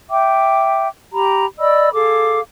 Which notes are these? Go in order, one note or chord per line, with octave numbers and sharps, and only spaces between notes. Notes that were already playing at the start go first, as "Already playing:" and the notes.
E5 G5 D6
G4 A#5 B5
D5 D#5 B5 E6
G#4 A4 F5 D6